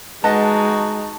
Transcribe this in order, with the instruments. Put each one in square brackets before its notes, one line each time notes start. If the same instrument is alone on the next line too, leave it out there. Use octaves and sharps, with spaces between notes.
[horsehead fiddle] G#3 [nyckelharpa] D#4 F#4 [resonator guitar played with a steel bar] B4 D#5 F#5 [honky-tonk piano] A5